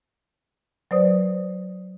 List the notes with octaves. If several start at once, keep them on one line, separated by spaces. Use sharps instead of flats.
F#3 B4 C5 D5 D#6